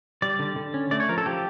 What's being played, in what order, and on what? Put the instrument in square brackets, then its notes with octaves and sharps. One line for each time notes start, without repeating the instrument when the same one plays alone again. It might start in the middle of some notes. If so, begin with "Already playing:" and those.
[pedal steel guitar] G3 D5
D3
D3
C#4
A3 D5
C#5
F3 A#4
A4
F3 G4